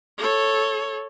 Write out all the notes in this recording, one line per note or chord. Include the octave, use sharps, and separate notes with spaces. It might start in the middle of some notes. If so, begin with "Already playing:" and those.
A4 C#5